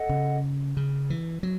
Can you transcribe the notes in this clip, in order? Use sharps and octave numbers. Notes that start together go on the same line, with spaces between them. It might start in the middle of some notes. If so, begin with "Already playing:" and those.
Already playing: A4 D#5 F#5
C#3
C#3
E3
F#3